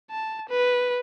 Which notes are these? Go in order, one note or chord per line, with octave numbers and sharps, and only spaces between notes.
A5
B4